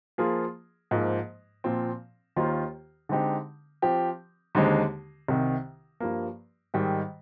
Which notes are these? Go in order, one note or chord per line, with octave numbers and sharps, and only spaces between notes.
F3 A#3 F4 G#4
G#2 F3 A#3
A#2 F3 C4
D#2 D#3 A#3 F4 C5
D3 G#3 C4 D#4 G4
F3 C4 G4
D#2 D3 G#3 C4 D#4
C2 C3 D#3
G2 F3 A#3
G#2 D#3 G3